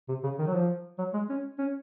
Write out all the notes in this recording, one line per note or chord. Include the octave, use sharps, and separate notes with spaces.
C3
C#3
D#3
F#3
F3
F#3
G#3
C#4
C#4